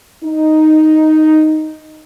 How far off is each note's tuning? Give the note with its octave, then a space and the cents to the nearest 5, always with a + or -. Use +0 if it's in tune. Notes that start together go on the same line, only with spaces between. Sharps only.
D#4 +0